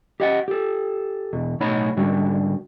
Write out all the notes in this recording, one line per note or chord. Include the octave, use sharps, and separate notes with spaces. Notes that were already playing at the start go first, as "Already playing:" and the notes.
G4 D#5 F5 F#5
G4 A4
E2 B2
B1 A2 D#4 C#5 F#5 B5
G#2 D3 G3 F#4